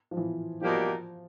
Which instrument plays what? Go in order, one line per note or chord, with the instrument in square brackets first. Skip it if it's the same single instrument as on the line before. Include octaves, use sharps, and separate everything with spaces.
[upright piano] F3
E3
[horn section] B2 G3 A#3 D#4 G4 [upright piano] F3